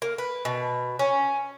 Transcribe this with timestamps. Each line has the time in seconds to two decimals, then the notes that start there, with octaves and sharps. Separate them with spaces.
0.02 A#3
0.18 B4
0.45 B2
0.99 C#4